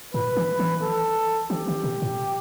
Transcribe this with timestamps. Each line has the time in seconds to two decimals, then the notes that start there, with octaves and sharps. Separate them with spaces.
0.14 A2 B4
0.37 E3
0.59 E3
0.82 A4
1.50 E3 G4
1.68 D#3
1.84 B2
2.02 A2